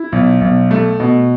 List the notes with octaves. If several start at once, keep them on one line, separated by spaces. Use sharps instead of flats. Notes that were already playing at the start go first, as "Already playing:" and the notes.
Already playing: E4
B1
B1
A3
B2